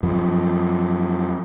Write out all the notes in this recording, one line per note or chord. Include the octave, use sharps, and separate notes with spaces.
F#2 F3